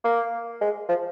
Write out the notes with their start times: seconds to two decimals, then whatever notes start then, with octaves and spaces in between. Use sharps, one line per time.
0.04 A#3
0.61 G#3
0.89 F3